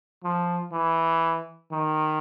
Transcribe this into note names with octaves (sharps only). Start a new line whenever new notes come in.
F3
E3
D#3